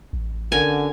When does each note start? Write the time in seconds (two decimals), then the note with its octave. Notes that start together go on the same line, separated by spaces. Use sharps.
0.13 A1
0.52 D3 C#4 F#4 A#4 G#5